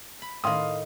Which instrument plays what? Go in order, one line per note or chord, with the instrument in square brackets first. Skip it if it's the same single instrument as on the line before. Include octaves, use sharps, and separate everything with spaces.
[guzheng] B5
[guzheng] A2 D#3 [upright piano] F5 C6 D#6